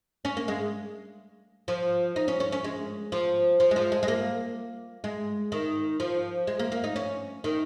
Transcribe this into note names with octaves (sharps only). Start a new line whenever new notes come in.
C#4
A#3
G#3
F3
D#4
C#4
C#4
C#4
G#3
F3
F3
G#3
F3
G#3
G#3
A#3
G#3
D#3
F3
G#3
A#3
A#3
D#4
C#4
D#3